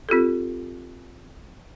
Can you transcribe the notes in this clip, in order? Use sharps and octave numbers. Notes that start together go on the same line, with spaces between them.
C4 F4 G4 A4